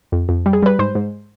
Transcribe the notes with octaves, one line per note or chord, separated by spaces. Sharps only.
F2
F2
G3
G#4
G3 B4
G#2 C5
G#2